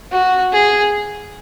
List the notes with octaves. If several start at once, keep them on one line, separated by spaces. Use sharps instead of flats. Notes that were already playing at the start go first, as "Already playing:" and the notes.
F#4
G#4